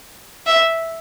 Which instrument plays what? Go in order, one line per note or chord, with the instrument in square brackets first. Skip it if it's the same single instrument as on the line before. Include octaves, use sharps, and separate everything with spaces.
[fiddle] E5